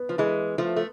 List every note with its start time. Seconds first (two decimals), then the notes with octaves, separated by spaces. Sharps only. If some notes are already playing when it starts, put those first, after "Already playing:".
Already playing: B3
0.09 F3
0.18 E3 G#3
0.58 F3 A3
0.76 A3